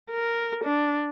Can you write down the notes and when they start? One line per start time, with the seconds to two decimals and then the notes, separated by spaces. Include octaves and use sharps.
0.11 A#4
0.64 D4